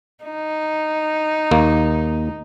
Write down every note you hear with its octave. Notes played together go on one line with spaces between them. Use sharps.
D#4
D#2 A#3